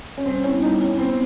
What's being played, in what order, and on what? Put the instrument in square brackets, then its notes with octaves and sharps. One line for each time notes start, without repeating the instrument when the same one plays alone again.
[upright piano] C#4
[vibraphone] G3 [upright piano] C4
[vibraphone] B3 E4 [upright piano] C#4
[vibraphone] G3 [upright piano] D#4
[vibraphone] B3 E4 [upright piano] C#4
[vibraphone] B3 [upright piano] C4